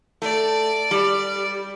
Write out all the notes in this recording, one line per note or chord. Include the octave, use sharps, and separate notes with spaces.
A3 D5
G3